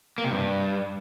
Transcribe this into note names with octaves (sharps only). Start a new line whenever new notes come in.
A#3
C3
G2